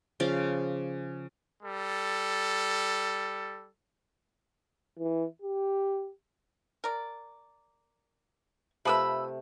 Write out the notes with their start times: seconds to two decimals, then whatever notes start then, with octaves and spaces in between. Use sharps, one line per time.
0.20 C#3 F3 D5 F5
1.63 G3 A4
4.99 E3
5.42 G4
6.84 A#4 D5
8.85 C3 F3 A3 B4 B5 D#6 E6